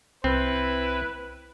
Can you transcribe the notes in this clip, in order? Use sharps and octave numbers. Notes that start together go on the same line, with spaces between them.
C2 C4 E4 B4